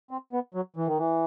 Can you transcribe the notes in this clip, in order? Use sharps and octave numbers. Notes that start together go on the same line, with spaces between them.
C4
B3
F#3
E3
D#3
E3